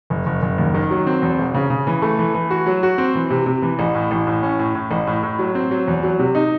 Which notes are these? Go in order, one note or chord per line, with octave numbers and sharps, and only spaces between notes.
F#1
F#1
F#1
D#2
D#3
F#3
C4
E2
E1
C#3
C#3
E3
A3
E3
E3
F#4
F#3
F#4
C4
E3
C3
C3
E3
A1
A2
A1
A2
C#4
A2
A2
A1
A2
A2
F#3
C4
F#3
E2
F#3
C3
D#4